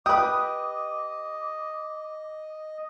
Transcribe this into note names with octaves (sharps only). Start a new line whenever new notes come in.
G4 B4 D#5 D6 D#6